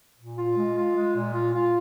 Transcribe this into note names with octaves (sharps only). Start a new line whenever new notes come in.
A#2
F4
G#3
F4
G#3
A#2
F4
F4